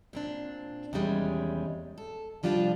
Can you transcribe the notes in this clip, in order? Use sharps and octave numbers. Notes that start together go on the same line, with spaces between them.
A#2 C4 D4
E2 C3 D#3 G3 G#3 C#4
A4
C3 F3 G3 D4 F4 D5